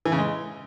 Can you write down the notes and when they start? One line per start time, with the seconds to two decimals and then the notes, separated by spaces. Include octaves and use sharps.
0.05 E3
0.12 C#3
0.18 G#3